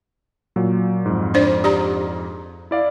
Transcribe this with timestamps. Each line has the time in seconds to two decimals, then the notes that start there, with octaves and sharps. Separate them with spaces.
0.56 A#2 F#3
1.06 F2 G#2
1.34 D4 C5 D5
1.64 G4 D5 A#5
2.71 E4 D5 F5